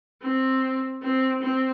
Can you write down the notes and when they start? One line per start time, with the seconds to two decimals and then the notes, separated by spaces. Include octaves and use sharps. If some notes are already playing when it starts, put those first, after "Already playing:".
0.22 C4
1.02 C4
1.42 C4